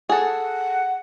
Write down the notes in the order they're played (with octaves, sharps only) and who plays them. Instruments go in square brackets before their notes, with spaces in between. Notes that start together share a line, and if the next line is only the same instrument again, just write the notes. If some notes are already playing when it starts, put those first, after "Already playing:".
[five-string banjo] G#4 A4 [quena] F#5